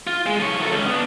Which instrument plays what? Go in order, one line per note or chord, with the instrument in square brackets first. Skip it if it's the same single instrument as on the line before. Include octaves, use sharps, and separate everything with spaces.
[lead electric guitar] F4
G#3
F3 C#5
F#3 A4
C#2 C#4
B3 D4